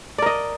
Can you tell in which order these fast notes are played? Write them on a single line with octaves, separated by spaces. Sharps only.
D5 A#4 D#5